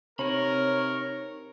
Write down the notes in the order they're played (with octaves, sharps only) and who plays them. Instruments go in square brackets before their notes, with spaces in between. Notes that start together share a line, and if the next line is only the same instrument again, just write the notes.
[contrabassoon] C3 [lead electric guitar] D#4 B5 [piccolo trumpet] A#4 [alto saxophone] C#5